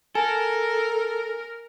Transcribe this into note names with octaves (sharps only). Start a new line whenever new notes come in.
A4 A#4 G#5